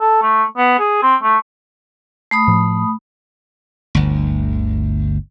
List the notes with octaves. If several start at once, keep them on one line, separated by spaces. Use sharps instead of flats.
A4
A3
B3
G#4
C4
A3
A3 B5 D#6
A2 F3
G1 D2